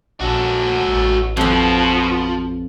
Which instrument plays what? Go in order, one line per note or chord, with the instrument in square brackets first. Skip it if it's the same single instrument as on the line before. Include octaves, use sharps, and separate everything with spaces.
[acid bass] A#1 [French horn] F#2 [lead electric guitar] F#4 A4
[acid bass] A1
[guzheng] F2 B5 [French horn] B2 [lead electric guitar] F3